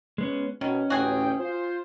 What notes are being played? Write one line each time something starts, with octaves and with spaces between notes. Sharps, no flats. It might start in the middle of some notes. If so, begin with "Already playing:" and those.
G#3 B3 C#4
B2 D#3 C#4
A1 D2 F#4 G#4 G5
F4 C5